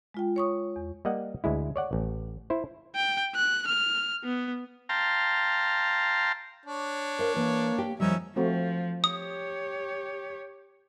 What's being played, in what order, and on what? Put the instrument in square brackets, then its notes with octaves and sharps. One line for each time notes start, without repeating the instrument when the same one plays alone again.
[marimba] G#3 F4 G5
C#5 C#6 D#6
E2
[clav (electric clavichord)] G3 A#3 D#5 F#5
D2 G#3 E4
C#5 D5 F#5
A1
E4 C5
[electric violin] G5
F#6
F6
B3
[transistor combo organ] F5 G5 A5 A#5 C6
[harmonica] D4 C#5
[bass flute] A#4 [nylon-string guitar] C5 F5
[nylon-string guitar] E3 [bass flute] A#3
[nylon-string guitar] G4
[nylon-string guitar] F2 D#3 G3 [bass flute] F3 [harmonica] C#4 D#4 E5
[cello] F3 [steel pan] A3 C4 F#4
[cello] G4 C#5 [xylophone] D#6